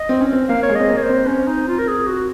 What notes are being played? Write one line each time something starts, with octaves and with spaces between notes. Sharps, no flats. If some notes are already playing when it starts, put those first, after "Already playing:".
Already playing: D#5
C4
C#4
C4
A#3 F5
C#5
G#3
C4 D#5
A#3
C#5
C5
C4
C#4
D#4
F4
A#4
G#4
F#4